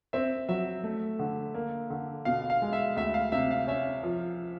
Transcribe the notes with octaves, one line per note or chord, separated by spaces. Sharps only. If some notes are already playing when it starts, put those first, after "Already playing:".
C4 E5
F#3 E5
A3
D3
A#3
D3
B2 F5
F5
G#3
E5
D2 E5
F5
C3 E5
F5
C#4 E5
F3